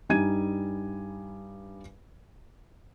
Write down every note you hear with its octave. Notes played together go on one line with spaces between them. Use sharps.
G2 G3 D#4 G#5 G#6 D#7